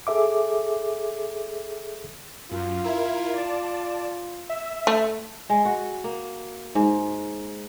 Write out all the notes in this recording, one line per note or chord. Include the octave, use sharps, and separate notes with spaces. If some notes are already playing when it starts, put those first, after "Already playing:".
G#4 A4 E5 D6
F#2 F4
E4 A#4 G#6
D5 A5
E5 E6
A3
G#3
F#4
A#3
G#2